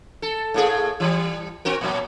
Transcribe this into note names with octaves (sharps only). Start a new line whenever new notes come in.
A4
A2 A#3 G#4
E3 G3
C4 F#4 A#4
A#2 F#3